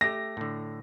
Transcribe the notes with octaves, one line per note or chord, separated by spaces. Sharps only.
A3 G4 A#6
A2 D3